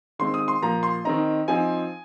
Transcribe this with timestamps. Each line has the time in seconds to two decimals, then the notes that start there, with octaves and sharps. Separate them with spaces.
0.19 D#3 G#3 C4 C6
0.34 D#6
0.48 C6
0.62 A#2 F3 A#3 A#5
0.83 C6
1.05 D#3 C4 D#4 A#5
1.48 F3 C4 D#4 G#5